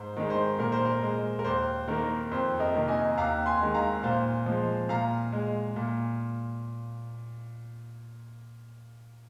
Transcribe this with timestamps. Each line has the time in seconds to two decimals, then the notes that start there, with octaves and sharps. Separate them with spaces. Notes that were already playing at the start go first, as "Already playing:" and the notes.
Already playing: G#2 C5
0.17 D#3 G#3
0.30 C5
0.59 A#2 A#4
0.72 C5
0.85 A#4
1.02 G#3
1.39 A#4
1.45 D#2 C5
1.88 D#3 A#3 A#4
2.31 F2 C5
2.60 A#4 D#5
2.74 C3 D#3 A#3
2.88 D#5 G#5
3.17 D#2 F5 A#5
3.46 G#5 C6
3.61 D#3 G#3
3.74 F5 A#5
4.03 A#2 C5 F5
4.46 F3 G#3
4.89 A#2 F5 A#5
5.32 G#3
5.76 A#2